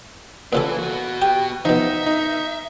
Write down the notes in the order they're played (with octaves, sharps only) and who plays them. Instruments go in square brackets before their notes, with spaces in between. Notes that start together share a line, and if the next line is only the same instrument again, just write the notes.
[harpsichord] A#2 C#3 A4 [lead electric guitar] E3 B4
[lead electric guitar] B3 F#4
[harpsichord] G4 G5
[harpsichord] B2 F3 [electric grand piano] D#4 [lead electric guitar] E5
[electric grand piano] D#4